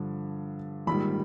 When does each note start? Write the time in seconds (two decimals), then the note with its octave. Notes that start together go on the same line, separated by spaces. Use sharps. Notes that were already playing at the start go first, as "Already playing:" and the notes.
Already playing: G2 D3 F3
0.87 A#1 G#2 D#3 G3 B5